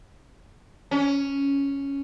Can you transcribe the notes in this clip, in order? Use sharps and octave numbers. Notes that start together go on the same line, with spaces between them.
C#4